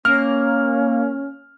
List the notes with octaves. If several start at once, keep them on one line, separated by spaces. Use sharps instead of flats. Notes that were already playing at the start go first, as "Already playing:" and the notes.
A#3 C#4 F6